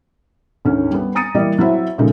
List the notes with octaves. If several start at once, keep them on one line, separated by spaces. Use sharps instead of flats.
D2 G#2 D#3 C#4
G3 B3
G#5 A#5 D#6 A6 C#7 D#7
E3 G3 A#3 D5 D#5
F#3 C4 E4 C5 E5
A#2 C#3 F3 G#3 D#4 A4